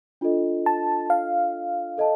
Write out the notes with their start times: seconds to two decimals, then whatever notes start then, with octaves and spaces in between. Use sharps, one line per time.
0.21 D4 F4 A4 D#5
0.66 A5
1.10 F5
1.98 A4 D#5 A5